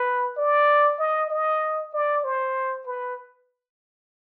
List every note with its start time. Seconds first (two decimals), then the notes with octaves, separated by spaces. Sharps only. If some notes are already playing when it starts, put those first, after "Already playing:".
Already playing: B4
0.37 D5
0.99 D#5
1.31 D#5
1.94 D5
2.24 C5
2.87 B4